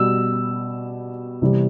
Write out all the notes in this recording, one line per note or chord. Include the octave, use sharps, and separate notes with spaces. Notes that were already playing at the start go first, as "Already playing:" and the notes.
Already playing: B2 G3 E6
C3 E3 G3